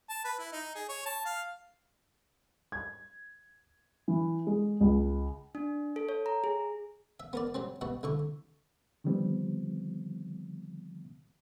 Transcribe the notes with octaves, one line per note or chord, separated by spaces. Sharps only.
A5
B4
E4
D#4
G#4
C#5
A5
F5
G#6
E3
G#3
C#2
D4
A4
C#5
A#5
G#4
E5
B3 A#4 D5
F#3 G3 C4
B2 G3 F#4
C2 D3 C#6
D3 D#3 F3 G3 B3 C4